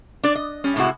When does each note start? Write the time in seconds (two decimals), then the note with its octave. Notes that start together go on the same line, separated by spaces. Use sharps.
0.23 D4 D5
0.35 D#5
0.64 G3 C#4
0.76 A2 C3 G#3 E4 F#4